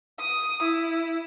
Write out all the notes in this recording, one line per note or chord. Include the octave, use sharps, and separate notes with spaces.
D#6
E4